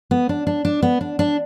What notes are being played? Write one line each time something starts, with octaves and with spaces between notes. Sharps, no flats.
B3
D4
D4
D4
B3
D4
D4